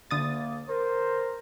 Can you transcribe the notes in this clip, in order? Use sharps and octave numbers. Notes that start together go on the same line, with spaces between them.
D2 D3 A#3 D#6 A6
A#4 C5